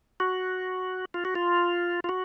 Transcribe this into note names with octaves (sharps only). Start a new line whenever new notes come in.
F#4
F4
F#4
F4
F4
F#4